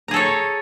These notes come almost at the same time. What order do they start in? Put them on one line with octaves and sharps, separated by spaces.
A#5 G#4 A4 C#5